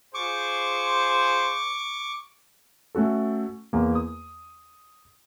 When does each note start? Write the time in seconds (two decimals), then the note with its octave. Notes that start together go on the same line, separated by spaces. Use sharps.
0.15 F4 G#4 C5 C#6 D6
2.95 A3 C#4 F#4 A4
3.73 E2 A#3
3.95 D#6